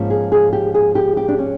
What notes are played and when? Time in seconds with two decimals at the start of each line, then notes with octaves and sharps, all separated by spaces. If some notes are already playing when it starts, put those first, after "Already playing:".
Already playing: G#2 F3 A#3 C#4
0.10 G#4
0.32 G#4
0.53 G4
0.74 G#4
0.95 G4
1.17 G4
1.28 D4
1.38 C#4